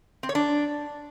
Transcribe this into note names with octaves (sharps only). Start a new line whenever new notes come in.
C4
C#5
D4